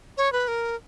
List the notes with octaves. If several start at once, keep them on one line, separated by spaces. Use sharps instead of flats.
C#5
B4
A#4